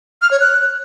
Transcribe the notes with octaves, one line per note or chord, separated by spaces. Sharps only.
F6
C#5
F#6